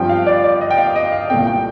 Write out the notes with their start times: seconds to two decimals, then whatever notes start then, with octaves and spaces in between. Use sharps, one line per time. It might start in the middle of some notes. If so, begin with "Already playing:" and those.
Already playing: G2 F3 C4 G5
0.09 F5
0.27 D5
0.44 D5
0.61 D#5
0.71 G5
0.78 F5
0.95 D#5
1.12 F5
1.30 C2 A#2 A3 C4 G5
1.47 G5